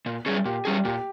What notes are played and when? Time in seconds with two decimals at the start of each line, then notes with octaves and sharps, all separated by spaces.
0.06 A#2
0.26 G3 C#4 G#4
0.45 A#2 G4
0.65 G3 C#4 G#4
0.85 A#2 G4